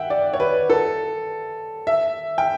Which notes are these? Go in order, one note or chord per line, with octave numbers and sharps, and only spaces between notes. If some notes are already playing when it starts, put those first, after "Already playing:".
Already playing: E5 F#5 G5
D5
C#5
B4
A4
E5
G5